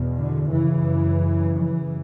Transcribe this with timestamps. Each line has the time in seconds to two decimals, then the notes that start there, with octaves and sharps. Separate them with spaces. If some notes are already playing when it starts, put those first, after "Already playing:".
Already playing: E2 B2
0.17 D3
0.53 F#2 C#3 E3
1.61 E3